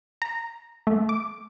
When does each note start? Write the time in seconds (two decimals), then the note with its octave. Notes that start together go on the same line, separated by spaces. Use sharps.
0.22 A#5
0.87 A3
1.09 D6